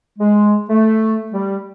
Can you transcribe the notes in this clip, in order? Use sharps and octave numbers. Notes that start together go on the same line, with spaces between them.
G#3
A3
G3